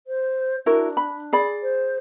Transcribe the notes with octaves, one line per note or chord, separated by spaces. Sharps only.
C5
D4 E4 F#4 A#4
B5
G#4 D5 B5
C5